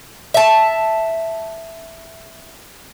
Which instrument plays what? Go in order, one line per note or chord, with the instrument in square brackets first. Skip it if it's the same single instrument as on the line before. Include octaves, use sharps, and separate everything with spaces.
[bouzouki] E5 A5